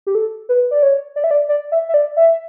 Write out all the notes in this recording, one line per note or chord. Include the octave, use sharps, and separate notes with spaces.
G4
A4
B4
D5
C#5
D5
E5
D5
D5
E5
E5
D5
E5